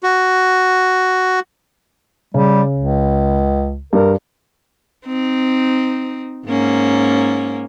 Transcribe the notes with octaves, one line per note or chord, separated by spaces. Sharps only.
F#4
C#3 G3
C#2
G2 A#4
C4 D#4
G#2 A#3 C#4